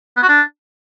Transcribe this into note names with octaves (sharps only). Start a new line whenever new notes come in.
B3
F#4
D4